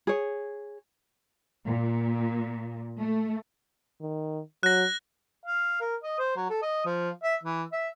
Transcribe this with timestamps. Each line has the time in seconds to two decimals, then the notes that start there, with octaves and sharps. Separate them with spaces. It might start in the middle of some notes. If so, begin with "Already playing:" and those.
0.07 G#4 C#5
1.66 A#2
2.98 A3
4.01 D#3
4.63 F#3 F#6 A#6
5.45 F5
5.81 A#4
6.03 D#5
6.19 C5
6.36 F#3
6.50 A4
6.62 D#5
6.85 F3
7.23 E5
7.43 E3
7.72 E5